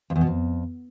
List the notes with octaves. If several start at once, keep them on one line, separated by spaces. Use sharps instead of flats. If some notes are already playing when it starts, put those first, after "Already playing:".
F2
E2
B2
F2